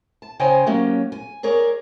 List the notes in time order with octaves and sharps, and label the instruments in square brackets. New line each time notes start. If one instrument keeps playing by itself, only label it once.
[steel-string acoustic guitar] A5
C#3 C5 C#5 D#5 G5 G#5
F#3 A#3 C#4 G4
G#5
G#4 A#4 C#5 D5